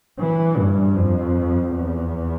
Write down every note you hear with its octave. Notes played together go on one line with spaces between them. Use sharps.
E3
G2
F2
E2